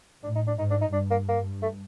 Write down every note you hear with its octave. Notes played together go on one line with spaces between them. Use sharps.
A2 D4
D#4
D4
G#2 D#4
D4
D#4
G2 D4
A#3
A#3
A3